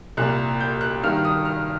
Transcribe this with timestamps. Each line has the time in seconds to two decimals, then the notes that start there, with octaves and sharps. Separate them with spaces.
0.17 C2 A#2 F#6
0.61 G6
0.81 F#6
1.03 G2 D#3 F6
1.25 D#6
1.45 F6